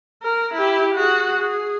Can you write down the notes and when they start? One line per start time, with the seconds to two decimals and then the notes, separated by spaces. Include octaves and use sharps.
0.22 A#4
0.54 E4 G4
0.95 F#4 G#4
1.38 G#4